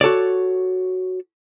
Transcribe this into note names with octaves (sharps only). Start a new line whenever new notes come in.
F#4 A4 C#5 D5